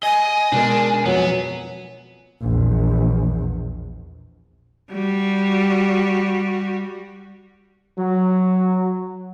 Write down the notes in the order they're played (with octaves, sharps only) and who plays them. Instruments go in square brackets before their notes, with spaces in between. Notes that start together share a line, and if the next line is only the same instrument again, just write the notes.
[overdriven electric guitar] D#5 [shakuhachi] G#5
[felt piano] B2 G#3 A#4 [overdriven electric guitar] D4
[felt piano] F2 [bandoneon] F#3 [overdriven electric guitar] B3
[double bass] A#1 E2
[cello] G3 F#4
[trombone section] F#3